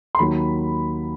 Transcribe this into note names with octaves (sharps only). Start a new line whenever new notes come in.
C6
D#2 D#3 F#3 B5